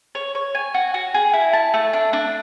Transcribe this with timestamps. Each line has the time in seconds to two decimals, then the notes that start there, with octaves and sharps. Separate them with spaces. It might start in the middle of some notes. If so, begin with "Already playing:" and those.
0.15 C#5
0.35 C#5
0.55 G#5
0.74 F#4
0.94 F#4
1.14 G#4
1.33 E4
1.53 A5
1.74 A3
1.93 D4
2.13 D4